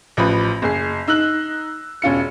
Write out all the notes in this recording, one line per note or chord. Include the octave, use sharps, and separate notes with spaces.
A1 F3 B4 B5
F#1 G#4 C7
D#4 E6 F#6 F#7
E1 C#4 F4 C#7